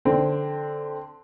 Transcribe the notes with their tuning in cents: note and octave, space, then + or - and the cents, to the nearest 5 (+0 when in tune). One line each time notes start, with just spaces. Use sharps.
D3 +0 C4 +0